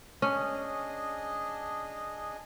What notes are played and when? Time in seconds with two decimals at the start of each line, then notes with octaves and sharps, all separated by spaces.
0.22 C#4 D4 G#4 D#5